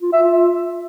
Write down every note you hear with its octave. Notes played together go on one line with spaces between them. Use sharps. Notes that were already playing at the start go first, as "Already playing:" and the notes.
F4
E5
F4